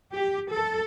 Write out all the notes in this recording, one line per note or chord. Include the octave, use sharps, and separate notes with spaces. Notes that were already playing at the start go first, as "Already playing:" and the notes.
G4
A4